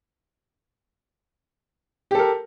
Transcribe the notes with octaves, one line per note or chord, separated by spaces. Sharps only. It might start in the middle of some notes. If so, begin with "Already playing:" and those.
G4 A4 A#4